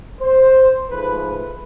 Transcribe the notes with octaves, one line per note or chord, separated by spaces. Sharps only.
C5
G#2 F3 A3 B4
B4